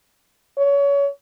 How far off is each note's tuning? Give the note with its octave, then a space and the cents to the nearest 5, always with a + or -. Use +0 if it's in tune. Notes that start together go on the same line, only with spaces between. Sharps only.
C#5 +25